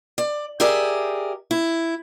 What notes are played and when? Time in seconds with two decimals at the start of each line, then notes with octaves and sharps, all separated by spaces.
0.18 D5
0.60 G4 G#4 A#4 D5 E5
1.51 E4